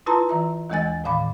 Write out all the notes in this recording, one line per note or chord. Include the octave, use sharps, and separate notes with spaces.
E4 F4 B4 A5 A#5 C6
E3 E5 A#5
D#2 E3 G#3 D#5 G#5 A6
A2 D#3 F5 B5 D6